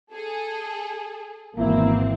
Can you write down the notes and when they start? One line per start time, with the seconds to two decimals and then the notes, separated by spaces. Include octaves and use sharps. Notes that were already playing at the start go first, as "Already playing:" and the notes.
0.12 G#4 A4
1.56 G#1 B2 E3 A#3 C4 E4